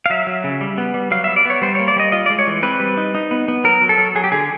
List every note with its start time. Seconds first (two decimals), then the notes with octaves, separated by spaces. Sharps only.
0.06 F5
0.10 F#3 E5
0.27 F#3
0.44 C#3
0.61 G3
0.78 B3
0.94 G3
1.11 F#3 F5
1.24 B3 E5
1.36 D5
1.45 B3 C#5
1.62 G3 C5
1.75 C#5
1.80 A#3
1.88 D5
1.96 G3 D#5
2.12 F4 D#5
2.26 D5
2.30 G#3
2.39 C#5
2.47 E3
2.63 C4 B4
2.80 G3
2.97 D#4
3.15 D#4
3.31 B3
3.48 B3
3.64 F#3 A#4
3.81 F#3
3.89 A4
3.98 F#3
4.15 F#3 G#4
4.24 G4
4.32 D3 G#4